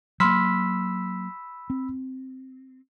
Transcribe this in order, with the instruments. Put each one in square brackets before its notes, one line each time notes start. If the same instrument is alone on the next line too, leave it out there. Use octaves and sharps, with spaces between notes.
[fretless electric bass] F#3 A#3 [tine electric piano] B5 E6 B6 [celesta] C6 F6
[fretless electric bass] C4